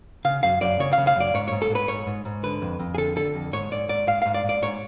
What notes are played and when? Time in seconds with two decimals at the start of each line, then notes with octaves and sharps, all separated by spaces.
0.25 C#3 F5
0.43 F#2 F5
0.61 F#2 D5
0.79 C#3 C#5
0.93 F5
0.98 C#3
1.07 F5
1.16 F#2 D5
1.34 G#2 C#5
1.48 G#2 C#5
1.62 A4
1.70 G#2 B4
1.88 G#2 C#5
2.07 G#2
2.25 G#2
2.43 D3 B4
2.62 F2
2.79 F2
2.94 G#4
2.98 D3 A4
3.16 D3 A4
3.35 F2
3.53 G#2 C#5
3.71 G#2 D5
3.89 G#2 D5
4.07 G#2 F5
4.22 G#2 F5
4.34 D5
4.44 G#2 D5
4.62 G#2 C#5